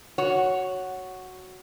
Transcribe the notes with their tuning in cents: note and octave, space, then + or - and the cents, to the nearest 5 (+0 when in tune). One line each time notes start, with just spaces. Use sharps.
F#4 +0 C#5 +0